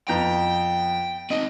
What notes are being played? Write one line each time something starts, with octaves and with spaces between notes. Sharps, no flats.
F2 B3 G5 A#5
C4 D#4 D#5